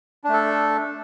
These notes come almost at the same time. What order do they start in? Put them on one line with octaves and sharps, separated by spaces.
D4 A3 A4